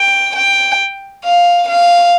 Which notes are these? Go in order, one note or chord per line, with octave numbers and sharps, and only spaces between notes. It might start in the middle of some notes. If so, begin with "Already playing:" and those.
Already playing: G5
G5
F5
F5